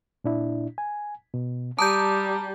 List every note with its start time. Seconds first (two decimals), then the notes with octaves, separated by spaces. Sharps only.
0.24 A#2 D4 E4
0.78 G#5
1.34 B2
1.78 G3 A5 A#5 D6 D#6 G6